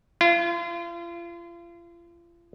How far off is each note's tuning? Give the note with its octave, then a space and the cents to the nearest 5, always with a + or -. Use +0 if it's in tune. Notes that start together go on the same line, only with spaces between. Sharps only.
F4 -35